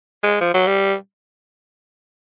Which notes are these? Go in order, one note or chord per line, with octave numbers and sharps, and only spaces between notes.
G#3
F3
F#3
G3